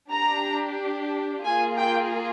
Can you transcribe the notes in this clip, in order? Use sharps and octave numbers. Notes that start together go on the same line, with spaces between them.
D4 G4 A#5
A#3 F4 G#4 G#5
G5